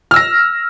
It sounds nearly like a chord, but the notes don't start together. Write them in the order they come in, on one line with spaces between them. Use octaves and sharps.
F6 E6 A#6